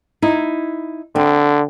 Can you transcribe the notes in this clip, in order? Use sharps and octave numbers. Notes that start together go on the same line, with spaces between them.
D#4 E4
D3 C4